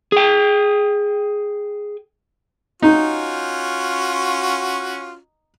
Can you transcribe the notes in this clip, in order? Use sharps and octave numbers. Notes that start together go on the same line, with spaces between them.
G#4 G5
C#4 D#4 F4 F#4